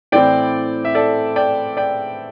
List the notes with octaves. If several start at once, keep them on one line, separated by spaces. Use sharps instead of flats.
A2 E3 C4 D5 G5
E5
A4 D5
D5 G5
D5 G5